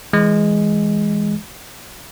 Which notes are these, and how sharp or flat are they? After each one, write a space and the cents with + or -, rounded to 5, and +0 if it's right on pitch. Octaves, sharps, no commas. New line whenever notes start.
E3 +0 G#3 +0